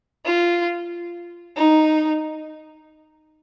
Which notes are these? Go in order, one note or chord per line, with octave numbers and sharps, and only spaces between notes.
F4
D#4